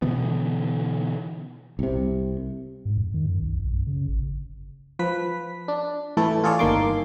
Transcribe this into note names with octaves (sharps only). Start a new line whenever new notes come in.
B2 D3 E3 B3
C2 C3
G#2
F2
D#3
F#2
C2
B1
F#2
C#3
G#1
F3 B4 B6
D4
A2 E3 A3 E4 A4
F4 G#4 A4 C#5 D5
G1 D#3 A#3 C6 D6